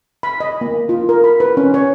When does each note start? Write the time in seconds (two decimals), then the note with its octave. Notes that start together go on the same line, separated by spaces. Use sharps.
0.23 B5
0.40 D#5
0.61 A#3
0.89 F4
1.09 A#4
1.24 B5
1.40 B4
1.57 C#4
1.74 C#5